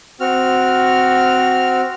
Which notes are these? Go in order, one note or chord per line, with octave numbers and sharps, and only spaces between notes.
C4 F#4 F6